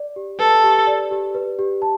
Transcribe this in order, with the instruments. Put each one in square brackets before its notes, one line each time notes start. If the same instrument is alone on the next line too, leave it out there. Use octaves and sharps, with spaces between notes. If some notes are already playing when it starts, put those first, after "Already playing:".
Already playing: [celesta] D5
G4
[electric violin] A4 [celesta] B4
[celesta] G4
D5
G4
B4
G4
A5